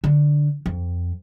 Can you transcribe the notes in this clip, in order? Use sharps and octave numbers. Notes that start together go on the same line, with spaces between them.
D3
F2